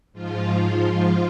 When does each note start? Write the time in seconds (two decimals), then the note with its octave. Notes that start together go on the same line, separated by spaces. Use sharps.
0.13 G#2 F3 F4